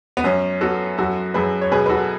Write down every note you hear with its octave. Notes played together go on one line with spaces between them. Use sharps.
B3
F#2 C#4
B3 F#4 A4
F#2 F#4 A4
F#2 G#4 B4
C#5
B2 G#4 B4
B4
F#4 A4